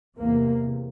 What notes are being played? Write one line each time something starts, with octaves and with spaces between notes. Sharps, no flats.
E2 C3 A#3